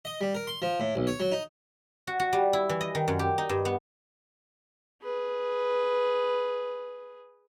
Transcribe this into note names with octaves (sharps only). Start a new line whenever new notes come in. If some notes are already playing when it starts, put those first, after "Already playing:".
D#5
G3
A#4
C6
F3
A2
B1
C#5
F#3
D#4
F#4
F#4
G3
E4
E3
D#5
D#3
F#2
G4
D#4
G2
B3
G#4 B4